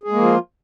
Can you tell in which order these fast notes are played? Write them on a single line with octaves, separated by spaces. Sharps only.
G#4 G#3 A#3 F3 F4